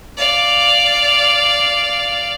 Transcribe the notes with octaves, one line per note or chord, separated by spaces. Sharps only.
D5 F5